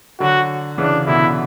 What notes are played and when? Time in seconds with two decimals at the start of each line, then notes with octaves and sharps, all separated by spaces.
0.20 D3 F#3 F#4
0.78 C#3 E3 D4
1.07 B2 D3 E4